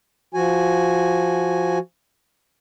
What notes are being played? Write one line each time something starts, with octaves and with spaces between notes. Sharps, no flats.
F3 F#4 G#5